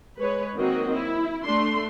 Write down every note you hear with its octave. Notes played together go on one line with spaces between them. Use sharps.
G#3 B4 C#5
D#3 F#3 A#3 C4 F#4 D#5
E4
A3 D4 C6